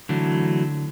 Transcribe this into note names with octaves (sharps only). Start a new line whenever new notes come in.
D3 E3 F#3 A3